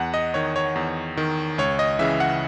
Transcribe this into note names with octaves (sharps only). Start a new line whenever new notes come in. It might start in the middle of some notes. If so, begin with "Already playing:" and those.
Already playing: E2 F#5
D#5
D#3 C#5
C#5
E2
D#3
C#2 C#5
D#5
C#3 E3 E5
F#5